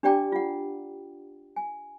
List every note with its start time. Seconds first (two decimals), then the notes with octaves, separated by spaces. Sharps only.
0.03 D4 G4 D5 G5 A#5 D6
0.32 F4 F#5
1.56 G#5